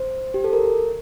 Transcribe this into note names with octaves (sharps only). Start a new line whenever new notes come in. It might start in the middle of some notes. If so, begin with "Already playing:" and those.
Already playing: C5
G4
A4
A#4